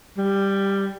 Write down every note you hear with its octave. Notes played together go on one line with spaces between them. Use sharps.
G3